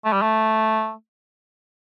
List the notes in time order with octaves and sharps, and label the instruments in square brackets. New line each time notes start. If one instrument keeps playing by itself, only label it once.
[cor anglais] A3
G3
A3